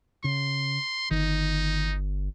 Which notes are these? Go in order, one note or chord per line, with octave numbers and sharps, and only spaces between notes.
C#3 C6
G1 D#3 D#4